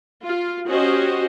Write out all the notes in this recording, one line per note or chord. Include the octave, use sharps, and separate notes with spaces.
F4
C#4 F#4 G4 C5 D#5